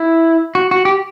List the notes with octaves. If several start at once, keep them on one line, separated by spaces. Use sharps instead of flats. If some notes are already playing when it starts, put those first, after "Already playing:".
Already playing: E4
F#4
F#4
G4